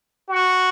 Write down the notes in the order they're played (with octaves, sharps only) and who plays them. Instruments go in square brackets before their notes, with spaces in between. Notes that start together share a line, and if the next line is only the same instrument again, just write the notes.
[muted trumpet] F#4